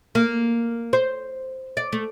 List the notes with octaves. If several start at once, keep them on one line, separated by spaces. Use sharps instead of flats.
A#3
C5
D5
A3